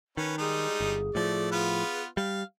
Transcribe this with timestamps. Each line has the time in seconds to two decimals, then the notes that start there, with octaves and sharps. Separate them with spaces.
0.17 D#3 C#4 B4
0.38 G3 G#3 D#4 G#4
0.81 G1
1.15 A2 F3 A3 D5
1.51 B3 F4 B4
2.17 G3 F5